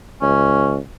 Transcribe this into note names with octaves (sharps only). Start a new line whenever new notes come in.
C#2 C#4